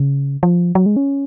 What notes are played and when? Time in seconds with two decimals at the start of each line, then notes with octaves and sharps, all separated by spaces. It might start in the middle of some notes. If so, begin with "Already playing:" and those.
Already playing: C#3
0.43 F3
0.75 F#3
0.86 G#3
0.96 C#4